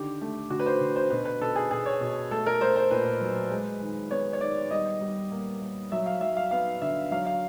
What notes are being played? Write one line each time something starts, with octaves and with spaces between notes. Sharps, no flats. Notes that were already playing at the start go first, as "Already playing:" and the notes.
Already playing: D3 D#3 G4
A3
D3 F#4
B4
C5
D3
C5
B2 B4
B4
B2 A4
G#4
B2 G#4
C#5
B2
A3 A4
A#4
A3 C5
C5
A#2 B4
F#3
G#3
D#3
B3 C#5
C#5
D#3 D5
G3 D#5
G3
A#3
A#3
F#3 E5
F5
F#3 E5
F5
B3 F5
D3 E5
F#3 F5
F5